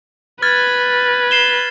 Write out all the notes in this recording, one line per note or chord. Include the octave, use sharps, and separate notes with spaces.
B4 F6 G#6 A6
C7 E7 G7